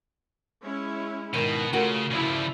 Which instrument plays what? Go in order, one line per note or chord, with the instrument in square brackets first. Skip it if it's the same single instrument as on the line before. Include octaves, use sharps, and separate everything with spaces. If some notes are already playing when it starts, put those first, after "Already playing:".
[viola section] G#3 C#4 E4
[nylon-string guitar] G#2 D#3 [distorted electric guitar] B2
[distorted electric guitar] C#3 [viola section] A3 F4 [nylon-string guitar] F#4 A#4
[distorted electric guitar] C#3 F3 [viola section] E4 D5